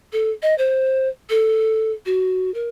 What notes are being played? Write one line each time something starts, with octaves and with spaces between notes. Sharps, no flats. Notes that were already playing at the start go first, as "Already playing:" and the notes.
A4
D#5
C5
A4
F#4
A#4